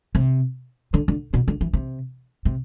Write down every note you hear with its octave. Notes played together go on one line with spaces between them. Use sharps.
C3
D3
D3
B2
D3
E3
C3
C3